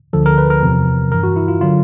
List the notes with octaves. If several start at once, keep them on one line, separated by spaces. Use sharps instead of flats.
D2 D3 F3 A4
A#4
B4
A#4
E2 C3 F3
G2 E3 A#4
F#4
E4
F4
D3 F#3 F4